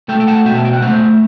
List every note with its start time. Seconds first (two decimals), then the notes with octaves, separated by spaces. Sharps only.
0.09 A3 E5 G5
0.20 G5
0.27 F#5 A5
0.45 B2 E5 G5
0.55 A5
0.65 G5
0.73 F#5
0.82 A3 C5 E5